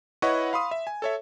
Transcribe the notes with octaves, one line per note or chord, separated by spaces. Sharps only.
E4 B4 C#5 D#5 F#5 C#6
F5 B5 C6 D#6
E5
G#5
A4 C#5 E5